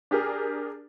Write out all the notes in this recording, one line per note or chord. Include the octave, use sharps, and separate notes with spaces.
D4 G4 G#4 A#4